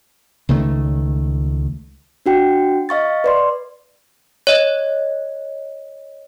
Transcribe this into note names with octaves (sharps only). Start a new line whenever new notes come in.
C#2 D#3 A3
D4 F#4 G5
D#5 F5 C#6 A6
B4 D5 C6
C#5 D#5